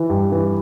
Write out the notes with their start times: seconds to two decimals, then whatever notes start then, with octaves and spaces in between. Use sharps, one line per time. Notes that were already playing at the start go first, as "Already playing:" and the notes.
Already playing: E3
0.10 G2
0.32 E3